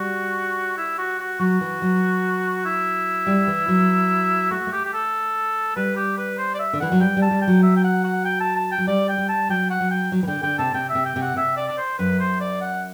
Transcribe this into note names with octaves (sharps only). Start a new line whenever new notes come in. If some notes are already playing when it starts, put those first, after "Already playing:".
Already playing: G3 F#4
E4
F#4
F#4
F#3 F#4
E3
F#3
E4
G3
E3
F#3
A3 F#4
A3
G4
G4
A4
G3 B4
G4
B4
C5
D5
E5
D3
E3 F#5
F#3
G3 G5
G3
A5
G3
G5
F#3
E5
G5
F#5
F#5
G5
A5
A5
G5
F#3
G3 D5
G5
G3
A5
F#3 G5
F#5
F#3
G5
F#3
E3
D3 G5
D3 G5
C3 A5
C3 G5
E5
C3
G5
C3
F#5
C3 E5
D5
D5
C5
F#2 B4
C5
D5
F#5